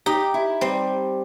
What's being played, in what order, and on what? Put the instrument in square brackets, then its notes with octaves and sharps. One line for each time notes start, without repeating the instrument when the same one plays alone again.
[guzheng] D#4 [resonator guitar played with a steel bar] G4
[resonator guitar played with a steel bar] E4
[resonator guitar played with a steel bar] G3 [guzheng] C4